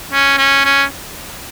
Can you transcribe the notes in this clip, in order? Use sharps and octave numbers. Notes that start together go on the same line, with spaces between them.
C#4
C#4
C#4